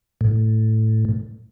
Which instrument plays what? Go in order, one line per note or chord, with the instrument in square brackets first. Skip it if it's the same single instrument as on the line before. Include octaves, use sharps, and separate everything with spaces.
[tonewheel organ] A2